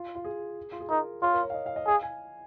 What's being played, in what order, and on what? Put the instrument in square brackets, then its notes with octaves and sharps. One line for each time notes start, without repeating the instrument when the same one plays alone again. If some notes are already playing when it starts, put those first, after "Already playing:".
Already playing: [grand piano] F4
F4
G#4
F4
G#4
[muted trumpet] D#4 [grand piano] A#4
[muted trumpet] F4 [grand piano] C#5
[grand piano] A#4
C#5
F5
D#5
F5
D#5
[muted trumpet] G#4 [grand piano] F5
[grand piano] G#5